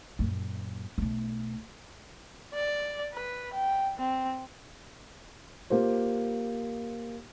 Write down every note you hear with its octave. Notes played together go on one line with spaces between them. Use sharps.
F#2 A#2
B1 A3
D5
B4
G5
C4
A#3 F4 G4 C5